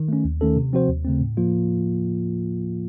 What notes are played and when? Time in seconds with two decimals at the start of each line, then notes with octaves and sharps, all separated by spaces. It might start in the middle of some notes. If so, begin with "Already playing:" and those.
Already playing: D#3
0.08 A3 C#4
0.25 D#2
0.41 D#3 A3 C#4 A4
0.56 C3
0.73 F3 C4 F#4 C5
0.88 D#2
1.05 C#3 A3 C4
1.21 A2
1.37 F3 A#3 F4